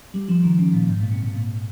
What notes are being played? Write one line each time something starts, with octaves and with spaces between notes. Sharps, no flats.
G3
F3
D#3
C#3
A#2
G#2
A#2
C3
C3
A#2